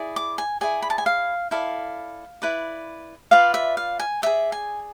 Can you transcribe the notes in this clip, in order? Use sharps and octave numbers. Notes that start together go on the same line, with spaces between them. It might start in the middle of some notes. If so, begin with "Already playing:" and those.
Already playing: E4 G#4 D5
D6
G#5
E4 G#4 D5 G#5
B5
A5
G#5
F5
E4 A4 D5 F5
E4 B4 D5
F4 B4 D5 F5
E5
F5
G#5
G#4 D5 E5
G#5